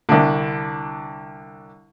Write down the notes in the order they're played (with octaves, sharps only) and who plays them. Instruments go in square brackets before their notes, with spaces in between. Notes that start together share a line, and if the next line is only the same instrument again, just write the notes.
[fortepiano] C2 D3